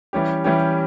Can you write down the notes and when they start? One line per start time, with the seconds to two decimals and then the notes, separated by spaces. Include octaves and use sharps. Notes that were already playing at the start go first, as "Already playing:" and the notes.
0.13 E3 G3 C#4 G4
0.44 E3 G3 C#4 G4